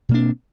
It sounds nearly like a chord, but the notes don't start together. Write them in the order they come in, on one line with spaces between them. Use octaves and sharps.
B2 A#3 D4 C4